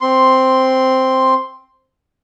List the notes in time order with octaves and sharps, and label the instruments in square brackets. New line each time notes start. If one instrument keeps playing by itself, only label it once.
[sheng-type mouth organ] C4 C6